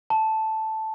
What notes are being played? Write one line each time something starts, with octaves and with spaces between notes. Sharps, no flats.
A5